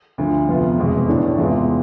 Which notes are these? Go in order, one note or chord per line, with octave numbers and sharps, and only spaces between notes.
D2 D3 F3
F2 C3 F3 B3 F4
F1 E2 B2 G#3
A1 A2 E3 A3 D4
E2 C3 G#3 B3 F4